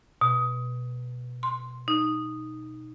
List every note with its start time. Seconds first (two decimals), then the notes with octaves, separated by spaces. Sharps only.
0.21 B2
1.43 C6
1.88 D#4